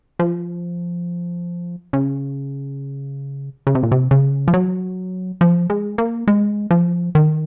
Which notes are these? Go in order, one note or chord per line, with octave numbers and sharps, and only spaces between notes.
F3
C#3
C#3
C3
A#2
C3
C#3
F3
F#3
F3
G#3
A#3
G#3
F3
D#3